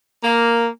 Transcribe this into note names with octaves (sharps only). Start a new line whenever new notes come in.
A#3